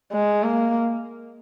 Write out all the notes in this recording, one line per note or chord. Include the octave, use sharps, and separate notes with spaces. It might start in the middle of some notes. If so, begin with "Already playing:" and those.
G#3
A#3